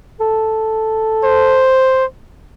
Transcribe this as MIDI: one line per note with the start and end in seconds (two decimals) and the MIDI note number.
0.20 1.75 69
1.24 2.04 72